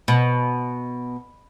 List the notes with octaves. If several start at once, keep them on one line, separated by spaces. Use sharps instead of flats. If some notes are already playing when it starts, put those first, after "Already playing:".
B2